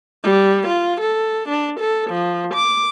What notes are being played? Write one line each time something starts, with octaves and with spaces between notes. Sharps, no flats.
G3
F4
A4
D4
A4
F3
D6